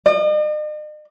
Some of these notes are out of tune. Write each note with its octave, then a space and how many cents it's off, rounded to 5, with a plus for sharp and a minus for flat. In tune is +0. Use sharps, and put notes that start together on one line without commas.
D#5 -45